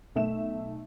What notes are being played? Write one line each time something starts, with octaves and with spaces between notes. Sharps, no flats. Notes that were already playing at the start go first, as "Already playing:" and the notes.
B1 A3 E5 E7